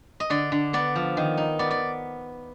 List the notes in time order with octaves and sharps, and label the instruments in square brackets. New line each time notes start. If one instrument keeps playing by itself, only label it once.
[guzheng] D#5
D3 D5
D3
B3 D5
F3
D#3
D#4
B3 D5
D5